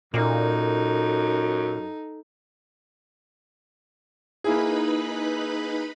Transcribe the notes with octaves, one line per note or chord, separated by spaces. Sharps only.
F#2 A#2 D#4 A4
A#3 D#4 E4 G#4 B4 B5